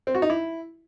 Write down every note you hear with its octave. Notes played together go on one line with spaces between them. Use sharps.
C4
F#4
D#4
E4